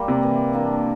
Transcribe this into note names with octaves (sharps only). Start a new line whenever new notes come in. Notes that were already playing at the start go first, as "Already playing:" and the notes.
Already playing: G3 A#3
C3
E3
A#3 D4